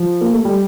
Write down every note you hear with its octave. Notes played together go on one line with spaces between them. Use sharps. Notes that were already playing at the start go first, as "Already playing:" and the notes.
Already playing: F3
A#3
A3
G3